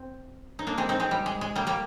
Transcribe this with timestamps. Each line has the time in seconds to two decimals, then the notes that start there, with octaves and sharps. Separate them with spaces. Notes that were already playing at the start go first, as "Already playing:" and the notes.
Already playing: C4
0.59 D#4
0.67 A#3 D4
0.77 G#3 C4
0.89 C4 D#4
1.00 G#3 C4
1.11 G3
1.26 G#3
1.41 G#3
1.55 G3 A#3
1.67 G3 A#3